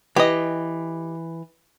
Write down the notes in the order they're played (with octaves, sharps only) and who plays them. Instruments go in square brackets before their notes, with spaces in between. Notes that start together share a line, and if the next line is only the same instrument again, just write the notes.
[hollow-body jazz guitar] E3 [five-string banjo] G4 D#5